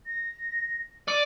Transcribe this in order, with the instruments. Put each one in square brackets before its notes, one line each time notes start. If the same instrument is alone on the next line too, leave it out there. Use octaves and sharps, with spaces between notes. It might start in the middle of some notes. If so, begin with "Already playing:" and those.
[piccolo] A#6
[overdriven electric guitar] D5 [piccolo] D#7